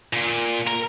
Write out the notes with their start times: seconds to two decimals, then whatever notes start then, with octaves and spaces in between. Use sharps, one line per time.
0.13 A#2
0.67 A#4